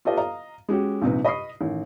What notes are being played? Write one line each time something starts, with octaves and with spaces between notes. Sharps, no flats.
F4 G4 A4 B4 D#5
D#5 F5 A#5
G#3 C#4 F#4 G4
A#1 G#2 C3 D#4 B4
D#5 B5 C#6 D#6 C7
A1 D#3